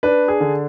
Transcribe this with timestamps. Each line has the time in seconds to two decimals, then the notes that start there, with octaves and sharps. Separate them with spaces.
0.03 D4 B4
0.28 G#4
0.40 D3